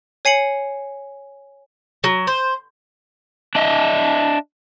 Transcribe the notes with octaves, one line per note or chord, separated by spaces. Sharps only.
C#5 G#5 C7 C#7 F#7
F#3
C5
D4 D#5 E5